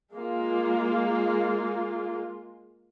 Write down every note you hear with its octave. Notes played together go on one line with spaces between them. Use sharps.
G#3 A#3 F4